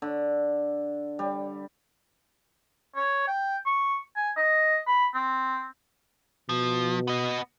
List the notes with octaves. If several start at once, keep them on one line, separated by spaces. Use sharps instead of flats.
D3
G3
C#5
G5
C#6
G#5
D#5
B5
C4
B2 F3
B3 D#5